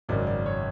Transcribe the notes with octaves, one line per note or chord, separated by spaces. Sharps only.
G#1 F#2 C#3 F#3 D5
D5
C#5